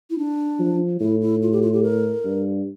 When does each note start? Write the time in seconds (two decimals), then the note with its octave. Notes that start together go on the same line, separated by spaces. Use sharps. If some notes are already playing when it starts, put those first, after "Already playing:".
0.10 E4
0.18 D4
0.60 F3
1.01 A2 E4
1.21 E4
1.42 F4
1.52 G4
1.62 F4
1.73 G4
1.83 A#4
2.25 G2